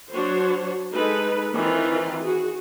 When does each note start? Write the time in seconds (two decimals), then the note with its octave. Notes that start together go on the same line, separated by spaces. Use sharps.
0.12 F#3 D4 F#4 C5 C#5
0.92 G#3 D#4 A4 B4
1.54 D#3 E3 C4 F4
2.20 F#4 G#4